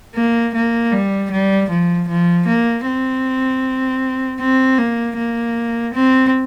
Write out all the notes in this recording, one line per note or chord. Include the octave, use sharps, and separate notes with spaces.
A#3
A#3
G3
G3
F3
F3
A#3
C4
C4
A#3
A#3
C4